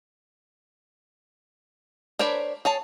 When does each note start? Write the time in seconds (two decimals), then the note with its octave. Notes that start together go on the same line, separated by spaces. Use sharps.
2.19 D4 A#4 C5 C#5 B5
2.65 G#4 C#5 A5